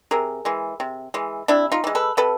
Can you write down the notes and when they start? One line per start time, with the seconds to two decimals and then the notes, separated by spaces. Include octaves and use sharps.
0.11 C3 G#4 A#4
0.45 E3 G#3
0.80 C3
1.14 E3 G#3
1.48 C3 D4 E4
1.72 D#4 F4
1.84 E3 G#3
1.95 A4 B4
2.17 C3 A4 B4